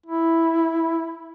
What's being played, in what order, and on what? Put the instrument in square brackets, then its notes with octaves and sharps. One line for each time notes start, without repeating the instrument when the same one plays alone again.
[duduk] E4